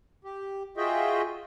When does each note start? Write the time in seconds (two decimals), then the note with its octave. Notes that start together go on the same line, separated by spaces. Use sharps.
0.24 G4
0.77 F4 F#4 G#4 D#5 E5 G5